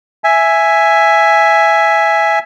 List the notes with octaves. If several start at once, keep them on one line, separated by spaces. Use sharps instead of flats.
E5 G#5